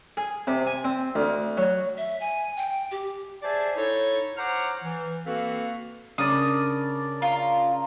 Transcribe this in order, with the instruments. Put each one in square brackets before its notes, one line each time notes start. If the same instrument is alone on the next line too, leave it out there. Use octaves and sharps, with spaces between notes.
[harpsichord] G#4
C3
G#5
C4
D2
F#3
[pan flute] E5
G#5
G5
G4
[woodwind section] G#4 C5 D5 E5 G#5 A5
D#4 E4 A4 C#5
C5 C#5 F#5 A#5 D6 F6
E3
A#3 C4 F#4 A4 B4 F5
[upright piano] C#3 [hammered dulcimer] D4 A#4 D5 [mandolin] D#6
[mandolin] F4 [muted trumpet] A#5